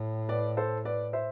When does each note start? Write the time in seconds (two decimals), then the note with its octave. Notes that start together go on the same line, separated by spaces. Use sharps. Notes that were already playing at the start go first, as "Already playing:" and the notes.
Already playing: A2
0.29 B4 D5
0.57 A4 C5
0.85 B4 D5
1.13 C5 E5